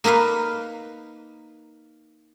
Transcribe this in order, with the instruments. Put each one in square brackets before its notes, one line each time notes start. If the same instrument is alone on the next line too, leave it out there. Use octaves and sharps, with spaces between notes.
[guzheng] A#3 D#4 A#4 B4 F5